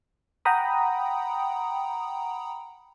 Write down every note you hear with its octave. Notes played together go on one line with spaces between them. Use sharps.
F#5 G5 A#5 B5 D#6